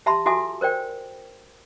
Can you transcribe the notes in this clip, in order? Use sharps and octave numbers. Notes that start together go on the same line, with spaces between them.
G4 E5 A5 B5 C6
F4 F#4 A4 E5 G#5 D6
A#4 C5 D5 G5